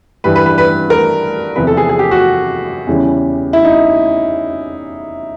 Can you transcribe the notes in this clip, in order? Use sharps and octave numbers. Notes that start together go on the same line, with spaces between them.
G2 E3 G3 B4
B4
B4
B4
A#4
E2 C3 F3 B4
A4
G#4
G#4
G4
F#4
E2 C#3 E3 G3
E4
D#4